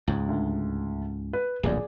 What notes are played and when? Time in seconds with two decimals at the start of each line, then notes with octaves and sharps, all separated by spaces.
0.08 C#2 G#2
0.28 D2
1.33 B4
1.63 D1 A#1 F#2 G#4 D5